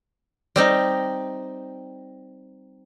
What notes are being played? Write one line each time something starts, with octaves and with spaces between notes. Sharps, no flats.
G3 C4 D#4